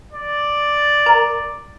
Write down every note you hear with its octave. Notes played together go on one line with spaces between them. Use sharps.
D5
A#4